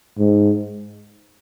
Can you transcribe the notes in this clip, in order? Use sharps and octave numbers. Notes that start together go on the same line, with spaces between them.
G#2